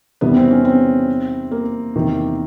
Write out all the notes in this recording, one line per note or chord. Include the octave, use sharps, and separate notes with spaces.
E2 C3 D#3 G3 B3
C4
C#4
C4
A#3
E2 C3 D#3